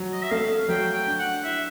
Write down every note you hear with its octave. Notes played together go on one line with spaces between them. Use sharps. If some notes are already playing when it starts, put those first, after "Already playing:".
Already playing: F#3
D#5
E5
A3 F5
F#3 G5
G5
D4
F#5
E4 E5